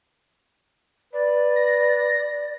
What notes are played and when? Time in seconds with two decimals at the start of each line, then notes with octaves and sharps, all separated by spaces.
1.13 B4 D5
1.56 A#6